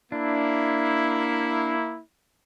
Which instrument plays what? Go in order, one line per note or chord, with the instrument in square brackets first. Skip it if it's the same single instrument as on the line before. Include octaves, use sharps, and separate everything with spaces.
[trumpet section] A#3 E4 [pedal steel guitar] D4